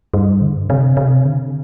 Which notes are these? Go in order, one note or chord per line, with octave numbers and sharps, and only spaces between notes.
G2
D3
C3
C3
D3